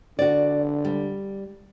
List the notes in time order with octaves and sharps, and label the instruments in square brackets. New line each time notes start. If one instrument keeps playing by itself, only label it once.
[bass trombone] D3 [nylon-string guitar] F#4 D5
[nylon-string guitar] G3